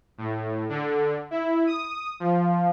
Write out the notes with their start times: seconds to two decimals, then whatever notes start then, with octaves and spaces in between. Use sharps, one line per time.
0.18 A2
0.69 D3
1.31 E4
1.67 D#6
2.20 F3